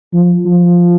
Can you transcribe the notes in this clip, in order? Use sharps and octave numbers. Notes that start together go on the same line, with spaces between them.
F3
F3